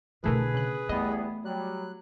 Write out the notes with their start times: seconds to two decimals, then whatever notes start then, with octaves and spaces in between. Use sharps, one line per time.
0.24 B2 D3 E3 A3 G#4 A#4 B4
0.55 C#3 F#6
0.89 E2 G3 A3 B3 D#5
1.45 F#3 G3 F#6